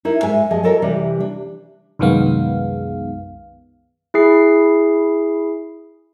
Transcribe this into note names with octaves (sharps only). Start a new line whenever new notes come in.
D#4 E4 A#4
G#2 G#3 E5 G#5
G2 F3 G#4 D#5
F4 F#4 A4 A#4 C#5 D#5
C3 E3 G3
D4
C2 F#2 D#3 G#3 B3 F5
E4 G#4 C7